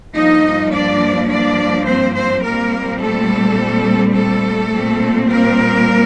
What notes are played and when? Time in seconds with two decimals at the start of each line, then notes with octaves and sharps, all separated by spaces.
0.14 G2 F3 A#3 D#4 D#5
0.72 D4 D5
1.29 D4 D5
1.86 C4 C5
2.15 C4 C5
2.43 A#2 G3 A#3 C4 A#4
3.01 A3 A4
4.15 A3 A4
4.72 A#2 G3 C4
5.29 A#3 A#4